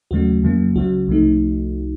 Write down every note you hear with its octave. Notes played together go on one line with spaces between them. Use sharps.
D#2 C#3 F#3 A3 F#4
F2 C#3 F#3 A#3
C#2 C#3 F#3 F#4
C2 C3 F3 A3 D#4